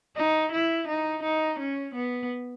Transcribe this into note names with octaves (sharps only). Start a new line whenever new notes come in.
D#4
E4
D#4
D#4
C#4
B3